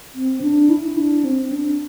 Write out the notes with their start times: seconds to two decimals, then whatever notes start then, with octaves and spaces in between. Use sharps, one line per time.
0.15 C4
0.42 D4
0.70 E4
0.97 D4
1.24 C4
1.52 D4